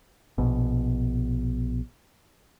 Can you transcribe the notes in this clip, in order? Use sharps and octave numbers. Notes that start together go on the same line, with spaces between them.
A#1 B2